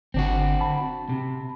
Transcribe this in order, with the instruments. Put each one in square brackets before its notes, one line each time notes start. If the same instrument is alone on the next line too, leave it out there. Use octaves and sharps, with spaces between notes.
[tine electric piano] G1 D3 [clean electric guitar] C4 D4 F#4
[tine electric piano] A5 B5
[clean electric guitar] C3